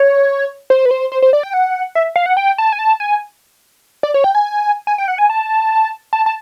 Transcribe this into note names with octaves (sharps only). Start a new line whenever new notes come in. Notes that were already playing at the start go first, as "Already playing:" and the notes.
Already playing: C#5
C5
B4
C5
C5
C5
D5
G5
F#5
E5
F5
F#5
G5
A5
G#5
A5
G#5
D5
C#5
G5
G#5
G#5
G5
F#5
G#5
A5
A5
A5